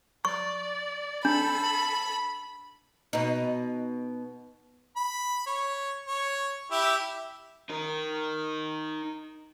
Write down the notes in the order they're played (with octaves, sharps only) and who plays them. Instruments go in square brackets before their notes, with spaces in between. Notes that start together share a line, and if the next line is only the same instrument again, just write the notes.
[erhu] D5 [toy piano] C#6
[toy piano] D4 [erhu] A4 [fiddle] B5
[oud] B2 D#4
[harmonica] B5
C#5
C#5
E4 G4 E5
[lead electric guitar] D#4 A#4